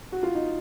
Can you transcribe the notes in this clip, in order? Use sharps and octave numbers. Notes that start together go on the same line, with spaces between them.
F#4
F4
D#4